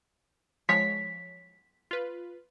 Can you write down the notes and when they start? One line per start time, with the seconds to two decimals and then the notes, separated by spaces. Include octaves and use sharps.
0.69 F3 G#3 C#5 B6
1.91 F4 B4